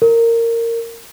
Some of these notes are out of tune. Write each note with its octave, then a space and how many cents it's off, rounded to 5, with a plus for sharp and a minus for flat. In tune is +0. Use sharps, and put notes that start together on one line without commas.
A#4 -15